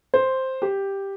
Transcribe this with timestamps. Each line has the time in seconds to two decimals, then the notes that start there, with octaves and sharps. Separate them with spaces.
0.14 C5
0.62 G4